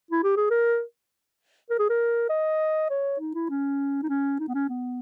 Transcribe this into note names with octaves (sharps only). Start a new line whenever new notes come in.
E4
G4
G#4
A#4
A#4
G#4
A#4
D#5
C#5
D#4
E4
C#4
D#4
C#4
D#4
B3
C#4
B3